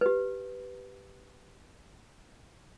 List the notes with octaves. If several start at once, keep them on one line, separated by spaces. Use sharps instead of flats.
G4 B4